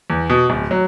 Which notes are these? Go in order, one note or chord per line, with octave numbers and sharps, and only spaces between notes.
E2
B2
D1
F#3